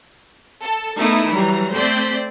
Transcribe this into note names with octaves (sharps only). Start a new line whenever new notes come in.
A4
A3 B3 D#4 E4 A#4
E3 F#3 G3 A#5
A3 C4 C5 D5 G6 B6